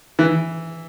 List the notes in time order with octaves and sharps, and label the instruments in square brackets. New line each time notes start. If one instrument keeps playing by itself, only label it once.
[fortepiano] E3